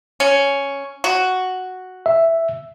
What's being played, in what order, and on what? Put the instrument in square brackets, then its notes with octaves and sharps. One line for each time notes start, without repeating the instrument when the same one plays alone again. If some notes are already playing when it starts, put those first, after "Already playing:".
[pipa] C#4
F#4
[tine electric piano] E5